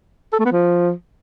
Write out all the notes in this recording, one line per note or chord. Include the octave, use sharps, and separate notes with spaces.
A4
A3
B3
F3